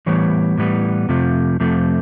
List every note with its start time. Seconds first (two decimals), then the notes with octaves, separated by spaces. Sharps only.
0.06 A2 E3 G3 B3 C#5
0.58 A2 E3 G3 B3
1.09 F2 C3 F3 A3
1.60 F2 C3 F3 A3